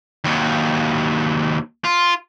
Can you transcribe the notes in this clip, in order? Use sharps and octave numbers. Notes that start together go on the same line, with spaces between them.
D#2 F#3
F4